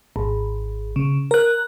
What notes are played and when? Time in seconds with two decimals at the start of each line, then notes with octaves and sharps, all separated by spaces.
0.16 G#1
0.96 C#3
1.31 A#4 F#6